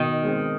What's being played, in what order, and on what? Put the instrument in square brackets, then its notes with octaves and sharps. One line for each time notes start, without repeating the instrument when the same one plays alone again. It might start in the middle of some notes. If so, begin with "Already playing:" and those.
Already playing: [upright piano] B2 [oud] D#3
[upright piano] G#3 C4